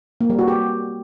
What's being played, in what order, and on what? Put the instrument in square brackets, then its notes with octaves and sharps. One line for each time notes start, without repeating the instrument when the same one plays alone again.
[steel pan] A#3
G3
F#4
G4